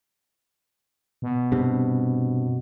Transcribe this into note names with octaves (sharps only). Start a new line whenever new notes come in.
B2
G2 C3